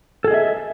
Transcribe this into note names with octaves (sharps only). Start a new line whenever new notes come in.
G#4 A4 D#5 E5